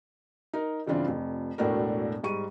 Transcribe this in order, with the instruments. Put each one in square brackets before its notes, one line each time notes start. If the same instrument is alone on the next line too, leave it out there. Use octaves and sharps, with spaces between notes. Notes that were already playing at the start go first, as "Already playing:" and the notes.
[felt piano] D#4 A#4
G2 C#3 E3 C4 D4 F4
F1 F2
E1 A2 A3 D4 F#4 A#4
G#2 G3 C#6 D#7